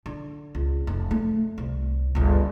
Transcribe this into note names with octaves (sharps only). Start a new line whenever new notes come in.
D3
C#2
F1
A3
C2
G1 C#2